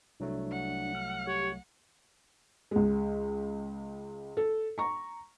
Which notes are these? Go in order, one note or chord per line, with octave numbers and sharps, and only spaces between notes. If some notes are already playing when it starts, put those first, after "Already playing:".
C2 F#3 A3 D4
F#5
F6
G4 C#5
C#2 G#3
A4
A#5 C#6